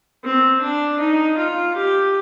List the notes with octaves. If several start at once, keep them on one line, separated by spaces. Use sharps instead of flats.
C4
D4
D#4
F4
G4